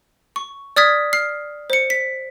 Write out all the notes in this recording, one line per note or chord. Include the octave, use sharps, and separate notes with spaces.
C#6
D5 D#6 F6 G#6 B6
F6 C7
C5 C#7
B6